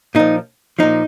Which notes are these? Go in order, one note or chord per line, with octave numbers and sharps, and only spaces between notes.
A#2 F3 D#4
A#2 F3 D#4